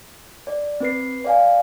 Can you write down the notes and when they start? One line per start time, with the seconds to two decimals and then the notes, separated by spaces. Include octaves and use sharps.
0.47 D5
0.80 C4 B4 C7
1.25 D5 F5 G#5